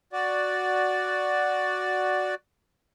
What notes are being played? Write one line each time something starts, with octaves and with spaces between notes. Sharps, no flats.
F#4 D5